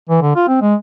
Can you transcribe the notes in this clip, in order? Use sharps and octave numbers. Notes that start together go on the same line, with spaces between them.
E3
D3
F4
C4
G#3